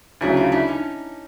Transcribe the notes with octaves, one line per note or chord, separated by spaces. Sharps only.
D2 C#3 F#3 D4 E4
D#4 F4
D4 E4
C#4 D#4